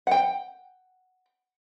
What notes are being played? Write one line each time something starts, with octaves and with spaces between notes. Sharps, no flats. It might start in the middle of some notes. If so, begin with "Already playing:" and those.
F#5 G5